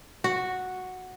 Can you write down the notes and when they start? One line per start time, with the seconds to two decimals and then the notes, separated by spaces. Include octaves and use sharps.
0.24 F#4